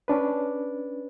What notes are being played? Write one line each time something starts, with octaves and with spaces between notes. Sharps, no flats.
C#4 D4 B4